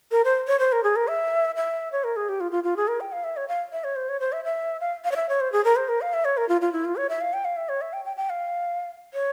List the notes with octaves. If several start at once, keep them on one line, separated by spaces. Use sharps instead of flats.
A#4
C5
C#5
C5
A#4
G#4
A#4
E5
E5
C#5
A#4
G#4
G4
F4
F4
F4
G#4
A#4
G5
F5
E5
C#5
F5
E5
C#5
C5
C#5
C5
E5
E5
F5
F5
C#5
E5
C#5
C5
G#4
A#4
C5
A#4
F5
E5
C#5
A#4
F4
F4
E4
F4
C#5
E5
F5
G5
F5
E5
C#5
E5
G5
G5
G5
F5
C#5